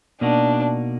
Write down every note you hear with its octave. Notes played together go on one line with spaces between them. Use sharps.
B2 A#3 D4 D#4 F#4